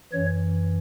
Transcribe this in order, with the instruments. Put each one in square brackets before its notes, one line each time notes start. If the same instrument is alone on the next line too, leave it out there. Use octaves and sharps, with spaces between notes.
[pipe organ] F#2 E3 C#5